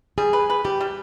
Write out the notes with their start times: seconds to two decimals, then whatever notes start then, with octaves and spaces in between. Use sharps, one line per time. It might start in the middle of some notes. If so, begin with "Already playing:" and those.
0.18 G3 G#4
0.33 B4
0.50 B4
0.64 G3 G4
0.80 G3